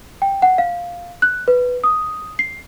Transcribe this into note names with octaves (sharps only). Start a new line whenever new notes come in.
G5
F#5
F5
F#6
B4
D#6
C7